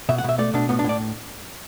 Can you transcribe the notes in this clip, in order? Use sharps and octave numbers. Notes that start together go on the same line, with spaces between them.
B2 E5
F#5
B2 E5
A3 D5
B2 D4
A2 B3
D4
A2 D5